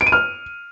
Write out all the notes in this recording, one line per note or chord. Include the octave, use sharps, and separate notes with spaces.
D7
D#7
F6